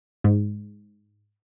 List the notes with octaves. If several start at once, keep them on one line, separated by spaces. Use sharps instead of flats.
G#2